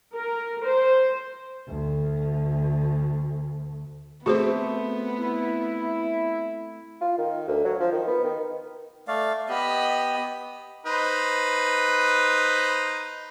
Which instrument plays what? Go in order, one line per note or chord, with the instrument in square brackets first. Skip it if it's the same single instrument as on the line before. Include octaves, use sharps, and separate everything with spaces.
[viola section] A#4
C5
[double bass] D2 D3
[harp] A3 C4 [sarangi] B3 [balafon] F#4 G#4 C5
[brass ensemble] E4
[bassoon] F4
D#3
D2
F#3
F3
D#3
B3
D#3
[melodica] A3 D5 F5
[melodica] B3 G4 [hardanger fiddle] D#5 B5
[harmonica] D#4 B4 C5